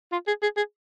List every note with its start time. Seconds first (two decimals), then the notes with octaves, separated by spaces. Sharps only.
0.12 F4
0.27 G#4
0.42 G#4
0.57 G#4